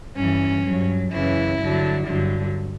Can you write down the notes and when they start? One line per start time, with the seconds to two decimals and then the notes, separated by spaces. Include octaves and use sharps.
0.16 G2 E3 C#4
0.64 G2 F#3
1.11 F#2 C#3 E3 E4
1.59 G2 D3 F#3
2.07 G2 D3 F#3